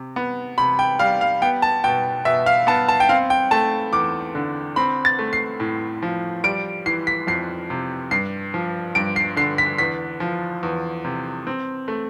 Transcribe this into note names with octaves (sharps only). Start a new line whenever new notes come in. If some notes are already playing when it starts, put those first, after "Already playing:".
Already playing: C3
B3
C3 B5
G5
G3 F5
F5
B3 G5
A5
B2 G5
B2 E5
F5
B3 A5
A5
G5
C4 F5
G5
A3 A5
E2 D6
D3
C4 B5
A6
A3
C7
A2
F3
G3 D7
E3 C7
B6
F2 C7
C3
G2 C7
F3
G2 D7
C7
D3 C7
B6
E2 B6
F3
E2
C3
C4
A3